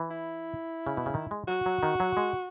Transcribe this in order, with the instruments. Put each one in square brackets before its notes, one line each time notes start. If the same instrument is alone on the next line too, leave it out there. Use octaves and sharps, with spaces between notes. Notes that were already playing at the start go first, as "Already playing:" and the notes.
Already playing: [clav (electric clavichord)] E3
[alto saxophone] E4
[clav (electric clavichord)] C#3
B2
C#3
D#3
G#3
[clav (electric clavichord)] F#3 [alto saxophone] F#4
[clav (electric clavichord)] F#3
D#3
F#3
G#3